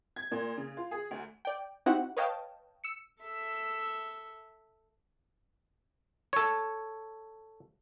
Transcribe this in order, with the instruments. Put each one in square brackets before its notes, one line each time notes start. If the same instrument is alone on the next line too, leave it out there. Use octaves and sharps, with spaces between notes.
[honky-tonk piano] G#6
A#2
C#3
F4
G#4
D2
[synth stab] D5 G5
C4 D#4 E4 F#4 G4 F#5
B4 C#5 D#5 F5 G5 A5
E6 C#7
[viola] A4 E5
[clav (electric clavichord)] A4 C#5